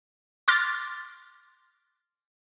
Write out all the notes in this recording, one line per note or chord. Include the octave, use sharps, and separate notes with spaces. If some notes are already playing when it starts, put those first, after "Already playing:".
C6 D6 F6 A6 A#6